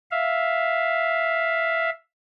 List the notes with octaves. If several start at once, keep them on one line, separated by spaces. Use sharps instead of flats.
E5 F5